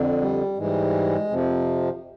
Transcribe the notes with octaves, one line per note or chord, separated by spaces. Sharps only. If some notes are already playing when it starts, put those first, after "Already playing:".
Already playing: F2 D3
G3
G#2 E3 G3 G#3
F2 C3 F3